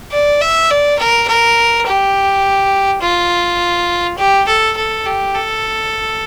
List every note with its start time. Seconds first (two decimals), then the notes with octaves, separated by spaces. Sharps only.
0.12 D5
0.41 E5
0.70 D5
0.99 A#4
1.28 A#4
1.87 G4
3.01 F4
4.18 G4
4.47 A4
4.76 A4
5.05 G4
5.34 A4